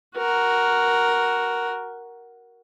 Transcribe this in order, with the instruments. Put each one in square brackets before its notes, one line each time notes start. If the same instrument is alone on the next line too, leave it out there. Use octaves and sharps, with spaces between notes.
[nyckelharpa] F#4 A#4